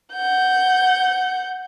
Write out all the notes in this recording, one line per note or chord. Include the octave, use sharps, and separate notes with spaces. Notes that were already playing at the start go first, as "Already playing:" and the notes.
F#5 G6